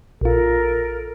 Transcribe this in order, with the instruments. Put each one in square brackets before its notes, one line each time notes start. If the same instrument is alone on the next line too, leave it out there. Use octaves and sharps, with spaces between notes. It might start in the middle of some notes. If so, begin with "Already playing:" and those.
[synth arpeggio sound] A#1 F4 [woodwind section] A4 A#4